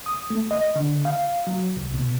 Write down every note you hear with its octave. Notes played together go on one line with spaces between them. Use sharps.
D#6
A3
D#5
D3
F5
F#3
C2
B2